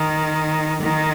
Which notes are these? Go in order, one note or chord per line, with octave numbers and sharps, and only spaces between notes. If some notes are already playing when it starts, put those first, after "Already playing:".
Already playing: D#3
D#3